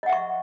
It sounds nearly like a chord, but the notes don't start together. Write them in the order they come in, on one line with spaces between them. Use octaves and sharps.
D#5 F#5 E5 C#6